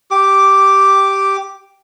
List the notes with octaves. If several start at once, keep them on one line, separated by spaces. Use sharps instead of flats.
G4 D6